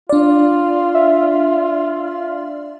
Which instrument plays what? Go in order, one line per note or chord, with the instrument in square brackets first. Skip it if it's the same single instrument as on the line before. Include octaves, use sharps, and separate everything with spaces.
[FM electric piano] D4 D5 [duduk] F4
[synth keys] E5